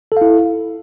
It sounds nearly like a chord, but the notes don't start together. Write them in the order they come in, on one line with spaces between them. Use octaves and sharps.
A4 F5 E4